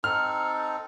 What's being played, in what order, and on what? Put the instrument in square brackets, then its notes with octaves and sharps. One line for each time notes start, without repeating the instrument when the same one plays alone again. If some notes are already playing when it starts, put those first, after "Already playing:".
[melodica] C4 D#4 A4 [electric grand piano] F6